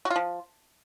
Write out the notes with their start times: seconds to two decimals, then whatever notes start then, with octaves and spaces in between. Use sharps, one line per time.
0.05 F#4
0.10 F4
0.16 F3